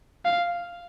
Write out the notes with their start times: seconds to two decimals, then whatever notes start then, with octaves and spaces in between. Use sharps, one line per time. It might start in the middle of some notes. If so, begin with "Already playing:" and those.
0.25 F5